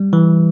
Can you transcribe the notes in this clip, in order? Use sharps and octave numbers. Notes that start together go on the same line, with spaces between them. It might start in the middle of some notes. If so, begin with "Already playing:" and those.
Already playing: G3
E3